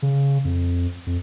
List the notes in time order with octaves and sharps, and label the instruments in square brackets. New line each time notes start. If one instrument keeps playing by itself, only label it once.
[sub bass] C#3
F2
F2